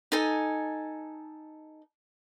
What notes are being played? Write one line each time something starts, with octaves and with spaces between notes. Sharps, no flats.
D#4 A4 G#5